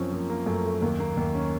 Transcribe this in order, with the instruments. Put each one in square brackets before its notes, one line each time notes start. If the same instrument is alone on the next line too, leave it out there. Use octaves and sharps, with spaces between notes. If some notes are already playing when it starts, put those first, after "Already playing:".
Already playing: [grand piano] F#2 F3 C4 C#4
F3 A#3
A#3
F#2 A3
A3
D#2 A#3
A#3
D#2
C#4